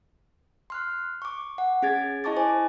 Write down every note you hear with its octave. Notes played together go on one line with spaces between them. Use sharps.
C6 F6 F#6
C#6 D6
F#5
C#4 G#4 G#6 A6
E4 D#5 A5 C#6 D6 A6
C5 G#5 D6